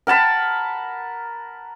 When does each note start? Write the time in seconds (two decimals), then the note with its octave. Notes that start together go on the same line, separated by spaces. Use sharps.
0.07 A#4 F#5 A5 B5